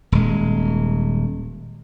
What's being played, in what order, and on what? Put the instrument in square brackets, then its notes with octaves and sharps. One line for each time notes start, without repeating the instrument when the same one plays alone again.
[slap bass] D#1 G#3